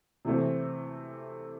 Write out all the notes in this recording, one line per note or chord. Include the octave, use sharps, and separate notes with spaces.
C3 E3 A3 C4